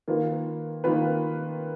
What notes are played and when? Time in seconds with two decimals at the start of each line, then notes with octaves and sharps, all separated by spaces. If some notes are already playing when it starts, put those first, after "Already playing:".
0.08 D#3 A#3 F4 B4
0.84 D#3 A#3 F4 B4